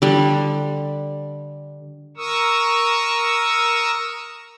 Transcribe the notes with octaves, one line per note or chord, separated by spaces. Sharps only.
D3 G3
A#4 C#6 D#6 E6